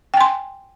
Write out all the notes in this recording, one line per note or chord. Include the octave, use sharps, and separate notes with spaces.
G5 G#5 C6